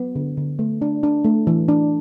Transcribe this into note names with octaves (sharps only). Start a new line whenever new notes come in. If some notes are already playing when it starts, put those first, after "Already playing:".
Already playing: F#3 B3
D3
D3
A3
D4
D4
A3
E3
D4